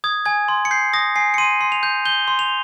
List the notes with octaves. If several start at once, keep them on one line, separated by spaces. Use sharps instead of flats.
D#6 G#6
G#5 G#6
C6
C#7
G6 C7
D#6 A#6
G#5 C7
C#7
C6 D#7
C6
F7
G6
G6 G7
C6
F7